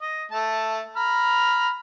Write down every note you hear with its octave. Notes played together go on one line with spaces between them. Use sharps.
D#5
A3 A5
A#5 B5 F6